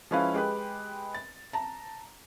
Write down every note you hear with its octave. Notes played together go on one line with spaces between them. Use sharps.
F3 G#3 C#4 E4 B4 F5
G#3 G4 B4
A6
A5 A#5